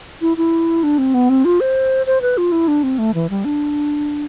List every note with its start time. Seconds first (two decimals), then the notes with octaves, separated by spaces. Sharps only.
0.21 E4
0.37 E4
0.83 D4
0.98 C4
1.14 B3
1.29 C4
1.45 F4
1.60 C5
2.06 C5
2.22 B4
2.38 F4
2.52 E4
2.68 D4
2.83 C4
2.98 A3
3.14 E3
3.30 G3
3.45 D4